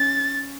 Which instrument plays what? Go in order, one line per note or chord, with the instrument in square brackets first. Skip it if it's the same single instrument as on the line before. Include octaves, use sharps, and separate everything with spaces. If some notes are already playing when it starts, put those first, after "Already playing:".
Already playing: [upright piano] C#4 [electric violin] A6